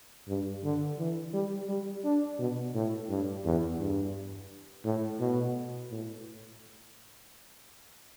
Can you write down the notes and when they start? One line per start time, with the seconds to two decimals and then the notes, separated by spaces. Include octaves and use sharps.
0.28 G2
0.64 D3
0.99 E3
1.33 G3
1.69 G3
2.04 D4
2.39 B2
2.74 A2
3.09 G2
3.45 E2
3.79 G2
4.85 A2
5.20 B2
5.91 A2